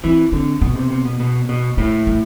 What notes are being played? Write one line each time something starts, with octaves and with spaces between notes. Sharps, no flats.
E3 C4
D3 C4
B2 B3
C3
C3
B2
B2
B2
A2 A3
A3